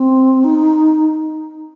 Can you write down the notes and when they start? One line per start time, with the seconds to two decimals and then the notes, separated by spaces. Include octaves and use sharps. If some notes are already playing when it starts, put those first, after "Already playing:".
Already playing: C4
0.44 D#4